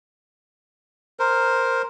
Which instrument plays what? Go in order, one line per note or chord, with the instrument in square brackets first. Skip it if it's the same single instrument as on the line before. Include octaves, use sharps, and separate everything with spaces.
[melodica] A#4 C5